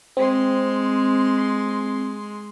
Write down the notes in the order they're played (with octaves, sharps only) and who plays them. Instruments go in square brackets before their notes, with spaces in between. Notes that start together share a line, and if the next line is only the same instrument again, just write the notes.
[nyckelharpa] G#3 C6 [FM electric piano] C4